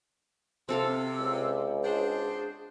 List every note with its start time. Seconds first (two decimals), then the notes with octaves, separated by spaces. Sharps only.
0.69 C3 C4 A4 F5 E6
1.20 C#2
1.84 D4 F#4 G#4 C5